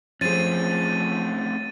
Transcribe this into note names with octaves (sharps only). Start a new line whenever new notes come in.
F3 A3 C4 C#4 G#4 A6 D#7